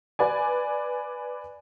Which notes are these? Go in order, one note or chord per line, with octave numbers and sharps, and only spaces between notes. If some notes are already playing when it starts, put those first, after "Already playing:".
B4 D5 G#5